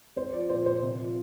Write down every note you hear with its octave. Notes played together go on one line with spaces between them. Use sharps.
C4 C5
F3 D5
A#2 C5
A#2 C5
C3
F3